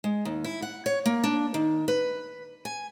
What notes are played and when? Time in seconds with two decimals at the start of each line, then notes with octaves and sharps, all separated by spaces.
0.04 G#3
0.25 D#2
0.44 E4
0.62 F#5
0.86 C#5
1.06 A#3
1.24 D4
1.54 D#3
1.88 B4
2.65 G#5